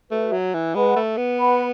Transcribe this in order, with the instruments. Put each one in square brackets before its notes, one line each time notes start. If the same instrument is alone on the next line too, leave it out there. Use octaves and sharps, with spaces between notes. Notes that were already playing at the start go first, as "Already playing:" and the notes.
[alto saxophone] A3 [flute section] F#4 B4 E5
[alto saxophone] F#3
E3
[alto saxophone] G#3 [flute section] B4 F#5 B5
[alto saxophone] A3
B3
[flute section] B4 F#5 B5